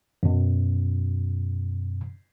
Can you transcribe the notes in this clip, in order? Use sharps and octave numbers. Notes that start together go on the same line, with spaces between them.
F#2 B2